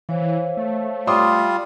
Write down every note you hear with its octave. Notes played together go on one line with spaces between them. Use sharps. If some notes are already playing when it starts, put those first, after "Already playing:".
E3 C5 C#5 F5
A3
G3 F4 C6 D6 D#6